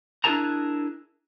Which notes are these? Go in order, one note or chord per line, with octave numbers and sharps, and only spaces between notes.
D4 E4 G#4 A#4 A5 A#5